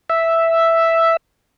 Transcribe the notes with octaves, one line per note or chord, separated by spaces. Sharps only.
E5